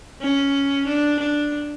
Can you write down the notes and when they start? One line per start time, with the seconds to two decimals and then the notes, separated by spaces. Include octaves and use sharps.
0.21 C#4
0.87 D4
1.20 D4